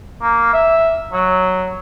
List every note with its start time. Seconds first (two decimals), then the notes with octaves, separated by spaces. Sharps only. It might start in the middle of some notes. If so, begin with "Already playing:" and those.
0.22 A#3
0.54 E5
1.13 F#3